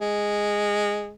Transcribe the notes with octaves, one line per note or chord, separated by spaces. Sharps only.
G#3